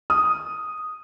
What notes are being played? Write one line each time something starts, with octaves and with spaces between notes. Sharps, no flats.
D#6